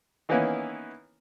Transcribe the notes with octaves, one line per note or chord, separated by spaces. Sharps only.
D#3 E3 A#3 B3 C#4 E4